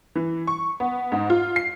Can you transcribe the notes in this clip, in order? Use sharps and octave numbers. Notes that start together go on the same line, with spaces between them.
E3
C#6
B3
G#2
F4
C7